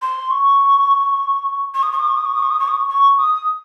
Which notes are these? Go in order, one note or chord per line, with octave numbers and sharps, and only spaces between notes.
C6
C#6
C#6
D#6
C#6
D#6
C#6
D#6
C#6
D#6
C#6
D#6
C#6
D#6
C#6
C#6
D#6